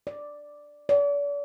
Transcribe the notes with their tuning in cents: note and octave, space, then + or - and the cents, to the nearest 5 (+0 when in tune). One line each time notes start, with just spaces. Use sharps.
D5 +0
D5 -40